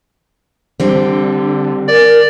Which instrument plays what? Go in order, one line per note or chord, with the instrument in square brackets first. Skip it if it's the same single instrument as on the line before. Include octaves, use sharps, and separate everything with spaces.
[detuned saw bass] D3 [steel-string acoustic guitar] G3 C4
[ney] A#4 [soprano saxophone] D5